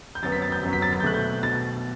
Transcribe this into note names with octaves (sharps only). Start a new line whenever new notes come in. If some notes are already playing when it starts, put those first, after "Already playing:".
G6
F#2 F#3 B3 A6
B6
A6
G6
F#2 F#3 B3
B6
A6
A6
G6
B2 A3 F#6
G6
B2 A6